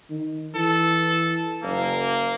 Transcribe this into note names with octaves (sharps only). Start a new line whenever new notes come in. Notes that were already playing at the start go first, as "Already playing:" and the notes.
D#3
E3 A4
F#1 A#3